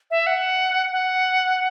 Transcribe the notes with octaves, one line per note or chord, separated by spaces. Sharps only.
E5
F#5
F#5